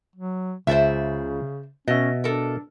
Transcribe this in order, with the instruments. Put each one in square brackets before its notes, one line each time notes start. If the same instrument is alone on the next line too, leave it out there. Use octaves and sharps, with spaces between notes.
[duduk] F#3
[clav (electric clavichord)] C#2 [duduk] C#3 [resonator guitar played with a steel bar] C5 D5 E5
[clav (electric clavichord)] B2 E5 [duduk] C#4 [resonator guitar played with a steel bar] D#5
[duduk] D4 [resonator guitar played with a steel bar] A4 A#4